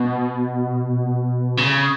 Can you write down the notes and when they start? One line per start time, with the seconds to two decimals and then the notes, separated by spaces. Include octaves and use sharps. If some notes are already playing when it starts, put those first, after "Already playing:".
Already playing: B2
1.58 C#3